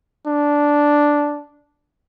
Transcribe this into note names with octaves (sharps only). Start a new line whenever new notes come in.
D4